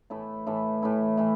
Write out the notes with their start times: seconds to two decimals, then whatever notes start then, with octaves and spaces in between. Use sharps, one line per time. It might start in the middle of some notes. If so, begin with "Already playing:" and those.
0.10 A2 E3 A3 E4
0.47 A2 E3 A3 E4
0.83 A2 E3 A3 E4
1.17 A2 E3 A3 E4